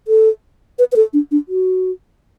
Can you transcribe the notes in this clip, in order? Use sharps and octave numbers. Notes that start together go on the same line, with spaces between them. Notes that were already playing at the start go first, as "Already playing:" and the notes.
A4
B4
B4
A4
D4
D4
F#4